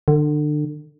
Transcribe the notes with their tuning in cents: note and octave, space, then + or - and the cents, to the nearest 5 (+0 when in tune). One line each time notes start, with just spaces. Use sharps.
D3 +30